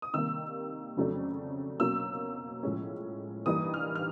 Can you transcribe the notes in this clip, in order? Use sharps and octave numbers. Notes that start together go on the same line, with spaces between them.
D#6
C3 D#3 G3 A#3 E6
F2 C#3 F#3 A3 D4
B2 F#3 A#3 C#4 E6
A2 F3 G#3 C#4
G2 E3 G3 A#3 D#4 D#6
F6
F6